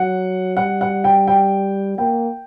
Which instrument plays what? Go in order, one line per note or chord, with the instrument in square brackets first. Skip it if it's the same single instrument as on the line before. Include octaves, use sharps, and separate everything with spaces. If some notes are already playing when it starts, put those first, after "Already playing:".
Already playing: [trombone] F#3 [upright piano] F#5
[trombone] G3 [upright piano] F#5
[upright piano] F#5
G5
G5
[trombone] A#3 [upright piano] G5